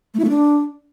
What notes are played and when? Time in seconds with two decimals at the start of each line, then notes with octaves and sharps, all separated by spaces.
0.14 A3
0.19 E4
0.24 A3
0.30 D4